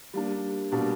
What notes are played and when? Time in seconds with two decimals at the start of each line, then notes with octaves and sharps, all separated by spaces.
0.14 G3 A#3 D4
0.72 B2 G3 A#3 D4